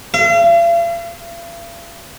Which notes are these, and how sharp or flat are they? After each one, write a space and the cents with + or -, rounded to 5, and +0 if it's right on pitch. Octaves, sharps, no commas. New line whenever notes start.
F5 -45